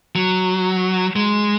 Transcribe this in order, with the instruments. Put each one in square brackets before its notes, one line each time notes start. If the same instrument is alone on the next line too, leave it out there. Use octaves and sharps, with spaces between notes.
[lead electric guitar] F#3
G#3